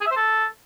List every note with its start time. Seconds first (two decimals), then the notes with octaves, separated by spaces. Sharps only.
0.01 G#4
0.06 E5
0.11 C5
0.16 A4